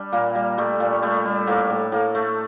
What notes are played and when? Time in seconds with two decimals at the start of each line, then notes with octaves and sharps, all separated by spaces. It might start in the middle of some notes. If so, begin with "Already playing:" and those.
Already playing: G3 D4
0.12 A#2 A#3
0.35 G3
0.58 G3 A3
0.80 A#2
1.02 G3 A3
1.25 G3
1.47 A2 A#3
1.70 A2
1.92 A2 A#3
2.15 A3